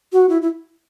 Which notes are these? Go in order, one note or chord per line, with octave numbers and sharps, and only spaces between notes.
F#4
E4
E4